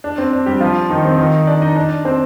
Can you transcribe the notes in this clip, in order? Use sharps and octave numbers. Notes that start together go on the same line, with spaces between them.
D4
C4
D4
G3 G4
F3 F4
D#3 D#4
C4
D#3 D#4
D4 D5
D#4 D#5
D4 D5
C4 C5